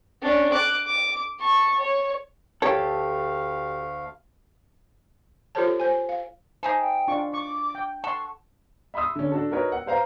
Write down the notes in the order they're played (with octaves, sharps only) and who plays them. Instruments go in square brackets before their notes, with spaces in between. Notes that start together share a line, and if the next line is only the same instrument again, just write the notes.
[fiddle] C#4 D4
D6 F#6
D6
A5 C#6
C#5
[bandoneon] D2 A3 F5 [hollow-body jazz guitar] G4 A4 [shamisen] C#5
[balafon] F4 G4 A4 C5 C#5 A5
C5 G#5
F5
[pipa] D#4 G#4 A4 [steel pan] C5
[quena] G5
[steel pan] D4 F4 C#6
[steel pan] C#6 [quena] D6
[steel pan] G5
[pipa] A4 [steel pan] F#5 C6 [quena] C#6
[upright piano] E5 B5 C6 D#6 E6
D3 C#4
D4 F#4 A4
D#4 F#4 A#4 B4 C#5
F#5
B4 C5 F5 A#5